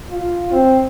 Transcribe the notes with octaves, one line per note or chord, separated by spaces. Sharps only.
F4
C4